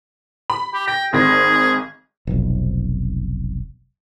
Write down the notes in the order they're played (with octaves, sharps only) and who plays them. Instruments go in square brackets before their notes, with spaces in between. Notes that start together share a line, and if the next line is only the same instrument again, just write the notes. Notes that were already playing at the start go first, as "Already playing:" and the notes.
[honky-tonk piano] B5
[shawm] G4
[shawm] G5 [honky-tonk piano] A#6
[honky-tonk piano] G#1 D#3 A#6 [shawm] G#4
[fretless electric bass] F1 B1